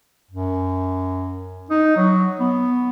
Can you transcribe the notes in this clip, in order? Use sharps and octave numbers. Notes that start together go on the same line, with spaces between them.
F#2
D#4
F#3
B3